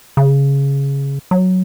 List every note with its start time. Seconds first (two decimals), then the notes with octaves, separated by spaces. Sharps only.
0.17 C#3
1.31 F#3